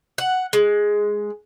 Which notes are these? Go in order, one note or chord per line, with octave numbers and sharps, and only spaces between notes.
F#5
G#3